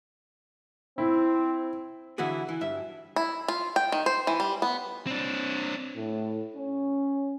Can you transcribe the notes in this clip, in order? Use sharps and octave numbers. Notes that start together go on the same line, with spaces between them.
C4 E4
D3 E3 E4 F#4 G#4
E3
G2 E5
E4
F4
G5
D#3
C5
E3
G3
B3
C4 D4
A2
C#4